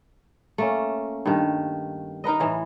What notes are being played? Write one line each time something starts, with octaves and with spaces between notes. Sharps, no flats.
A3 A#3 C#4
G2 D#3
D#4 A#4 B4 D#5
A2 E3